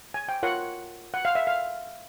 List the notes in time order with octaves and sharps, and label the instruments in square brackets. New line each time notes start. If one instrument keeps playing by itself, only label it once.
[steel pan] G#5
G5
F4 A#4 C#5 F#5
F#5
F5
E5
F5